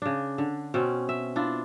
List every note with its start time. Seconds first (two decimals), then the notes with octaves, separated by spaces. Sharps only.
0.02 C#3 D4
0.38 D3
0.74 B2 C4 C#4
1.09 E5
1.36 D4 E4 F4